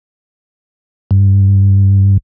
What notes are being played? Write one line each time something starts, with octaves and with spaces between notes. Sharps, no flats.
G2